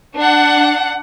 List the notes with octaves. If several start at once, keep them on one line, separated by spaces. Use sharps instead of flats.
D4 F#5